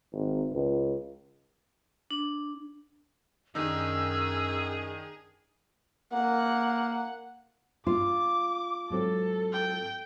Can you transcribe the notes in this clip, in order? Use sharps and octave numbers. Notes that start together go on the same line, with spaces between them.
G#1
C#2
D4
F#2 D#3 D4 D#4 G#4 E6
A#3 F#5
F4 D6
G#2 F#3 C4 A4
G5